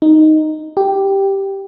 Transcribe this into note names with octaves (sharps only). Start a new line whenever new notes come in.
D#4
G4